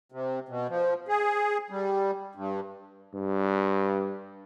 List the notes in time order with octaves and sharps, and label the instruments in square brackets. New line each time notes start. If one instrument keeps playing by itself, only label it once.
[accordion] C3
B2
F3
G#4
G3
G2
[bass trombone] G2